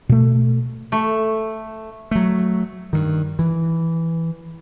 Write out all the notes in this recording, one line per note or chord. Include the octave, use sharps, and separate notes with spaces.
B2 A3
A3
F#3 A3
G2 D#3
E3